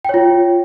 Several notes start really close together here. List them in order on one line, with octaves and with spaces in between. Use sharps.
G5 C#5 F4